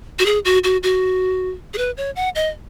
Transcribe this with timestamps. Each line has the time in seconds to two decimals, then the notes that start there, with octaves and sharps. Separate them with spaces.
0.19 F#4
0.26 G#4
0.45 F#4
0.64 F#4
0.83 F#4
1.74 G#4
1.78 B4
1.97 C#5
2.16 F#5
2.35 D#5